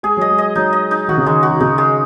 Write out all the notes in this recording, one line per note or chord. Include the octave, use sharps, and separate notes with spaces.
G#3 G#4
F#3 D#5
G#3
D#5
F#3 D#4
D#5
D#4
D#3 F#4
C#3
D#3 G#3
F#4
D#3
C#3 D#4
G#3